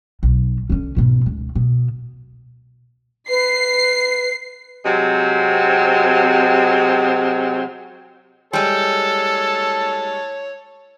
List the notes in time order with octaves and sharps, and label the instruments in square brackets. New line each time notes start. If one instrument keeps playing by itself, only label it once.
[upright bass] B1
D3 C#4
G#2 B2
C#2
B2
[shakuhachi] B4 [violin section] C7
[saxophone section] C3 F#3 G#3 C4
[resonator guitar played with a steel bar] G3 G#3 [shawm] A4 [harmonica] C#5 A5